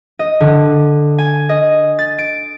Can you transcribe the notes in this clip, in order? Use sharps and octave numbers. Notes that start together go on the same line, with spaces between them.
D#5
D3
G#5
D#5
A6
D7